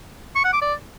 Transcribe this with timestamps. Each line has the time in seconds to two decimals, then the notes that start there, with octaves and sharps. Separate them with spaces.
0.35 C#6
0.44 F#5
0.53 D6
0.62 D5